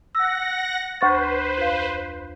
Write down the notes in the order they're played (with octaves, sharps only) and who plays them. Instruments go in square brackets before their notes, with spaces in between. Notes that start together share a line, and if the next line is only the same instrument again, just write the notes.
[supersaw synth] F#5 A#6 [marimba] E6
[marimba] D2 C#6 A6 [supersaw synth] B4 C5
[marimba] F2 F5